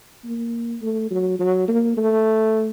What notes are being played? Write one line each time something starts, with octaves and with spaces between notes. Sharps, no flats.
A#3
A3
F#3
F#3
A#3
A3